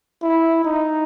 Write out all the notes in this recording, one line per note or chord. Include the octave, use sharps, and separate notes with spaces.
E4
D#4